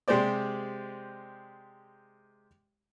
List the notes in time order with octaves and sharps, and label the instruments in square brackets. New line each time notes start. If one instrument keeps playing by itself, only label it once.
[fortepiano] C3 G#3 G4 C5 D5